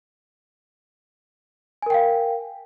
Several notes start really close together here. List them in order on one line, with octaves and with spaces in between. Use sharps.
G#5 A#4 G5 F5